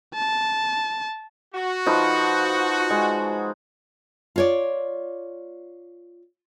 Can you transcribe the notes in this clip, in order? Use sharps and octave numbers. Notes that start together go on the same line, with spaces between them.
A5
F#4
F3 D#4 B4
G#3
F4 C#5 D5